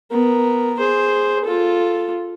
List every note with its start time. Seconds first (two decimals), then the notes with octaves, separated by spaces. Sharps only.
0.11 B3 A#4
0.79 G#4 C5
1.45 F4 A4